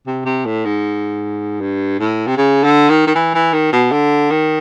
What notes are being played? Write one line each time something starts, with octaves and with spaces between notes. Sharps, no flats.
C3
C3
A2
G#2
G2
A2
C3
C#3
D3
D#3
D#3
E3
E3
D#3
B2
D3
D#3